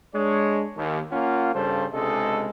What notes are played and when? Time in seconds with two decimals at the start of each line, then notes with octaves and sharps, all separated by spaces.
0.14 G#3 D4 C#5
0.76 D#2
1.11 A#3 C#4 F4 F5 F#5
1.54 G2 C#3 G3 A4 C5
1.93 C#2 C3 G#3 D4 A4 D#5